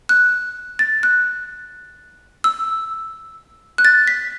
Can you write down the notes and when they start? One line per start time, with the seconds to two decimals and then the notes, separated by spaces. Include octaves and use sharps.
0.09 F#6
0.79 A6
1.03 F#6
2.44 E6
3.78 F#6
3.85 A6
4.07 B6